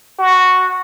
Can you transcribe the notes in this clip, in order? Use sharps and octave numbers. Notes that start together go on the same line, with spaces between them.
F#4